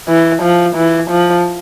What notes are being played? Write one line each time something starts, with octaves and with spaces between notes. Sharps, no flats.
E3
F3
E3
F3